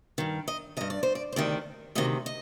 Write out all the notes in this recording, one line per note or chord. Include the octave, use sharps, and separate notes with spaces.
G2 D#3
D#5
G2 D#3 D#5
D5
C5
D5
C5
D2 C3 D#3 D5
D2 C3 D#3 D#5
D#5